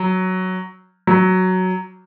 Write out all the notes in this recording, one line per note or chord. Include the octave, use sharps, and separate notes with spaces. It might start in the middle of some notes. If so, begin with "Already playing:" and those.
Already playing: F#3
F#3